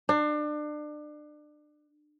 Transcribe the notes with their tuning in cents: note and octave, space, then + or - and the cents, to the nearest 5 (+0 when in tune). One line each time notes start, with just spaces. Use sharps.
D4 +30